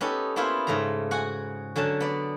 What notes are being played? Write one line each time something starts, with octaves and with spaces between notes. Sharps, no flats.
B3 C#4 D#4 G4 A4
A#3 B3 C#4 E4 F4 C5
G#2 C#3 A3 F5 A#5
F#4 F#5 G#5
D3 F#3 C#4 A5
B3 D5